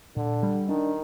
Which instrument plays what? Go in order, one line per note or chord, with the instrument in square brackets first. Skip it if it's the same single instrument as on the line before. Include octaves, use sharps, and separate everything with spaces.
[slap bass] A#2 [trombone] D3
[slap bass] G3
[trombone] D#3 [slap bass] D4